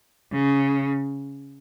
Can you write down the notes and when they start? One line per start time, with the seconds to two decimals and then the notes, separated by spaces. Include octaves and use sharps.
0.32 C#3